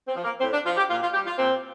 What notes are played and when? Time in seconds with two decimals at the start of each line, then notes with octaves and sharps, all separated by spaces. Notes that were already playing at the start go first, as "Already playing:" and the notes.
0.08 C4
0.16 F3
0.24 A#3
0.40 A2 C4
0.52 D4
0.65 F3 F4
0.77 G4
0.89 A#2 F4
1.02 F4
1.14 G3 G4
1.26 F4
1.38 A#2 C4